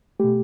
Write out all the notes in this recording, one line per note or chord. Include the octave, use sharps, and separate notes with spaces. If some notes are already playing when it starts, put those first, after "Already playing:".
B2 A3 G4